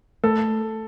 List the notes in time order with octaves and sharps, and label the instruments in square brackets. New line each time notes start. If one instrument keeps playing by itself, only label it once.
[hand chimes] A3 [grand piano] A4